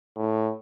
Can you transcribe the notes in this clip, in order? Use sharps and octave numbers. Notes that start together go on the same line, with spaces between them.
A2